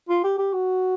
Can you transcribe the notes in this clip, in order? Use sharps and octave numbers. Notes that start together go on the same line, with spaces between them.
F4
G4
G4
F#4